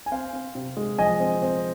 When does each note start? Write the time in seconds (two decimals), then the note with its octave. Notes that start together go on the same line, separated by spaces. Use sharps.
0.06 G#5
0.12 C4 C5 F5
0.33 C4
0.55 C3
0.77 G#3
0.98 F3 D#5 G#5
1.20 C4
1.42 C4